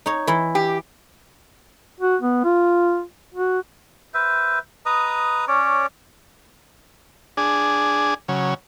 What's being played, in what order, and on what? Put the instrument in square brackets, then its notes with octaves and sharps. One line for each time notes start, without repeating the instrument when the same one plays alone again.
[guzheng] D#4 C#5
E3 E4
[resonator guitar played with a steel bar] G4
[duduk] F#4
B3
F4
F#4
[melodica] B4 C5 E5
B4 D#5 A#5 D#6
C#4 C#5 D5
[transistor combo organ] D4 G#4
C#3 F#3